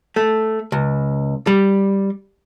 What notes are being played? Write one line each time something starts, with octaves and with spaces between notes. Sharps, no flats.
A3
C#2
G3